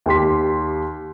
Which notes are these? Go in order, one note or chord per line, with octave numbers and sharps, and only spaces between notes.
D#2 G4 C6 B6